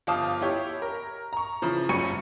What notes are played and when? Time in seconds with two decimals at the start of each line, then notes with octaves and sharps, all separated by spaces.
0.07 G1 F3 F5 A5 D6 D#6
0.42 E4 G4 C#5
0.82 A#4
1.33 A#5 C#6
1.62 C#3 E3 F3
1.89 F#1 F#3 G3 C#6 C#7 D#7